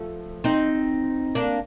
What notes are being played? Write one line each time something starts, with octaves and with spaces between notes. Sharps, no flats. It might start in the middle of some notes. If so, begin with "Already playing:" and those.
Already playing: F3 A3
C4 D#4
A#3 D4